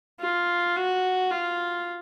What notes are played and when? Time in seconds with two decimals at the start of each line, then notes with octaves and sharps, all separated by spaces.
0.20 F4
0.76 F#4
1.31 F4